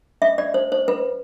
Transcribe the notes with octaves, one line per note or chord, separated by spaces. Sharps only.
E5
D5
C5
C5
B4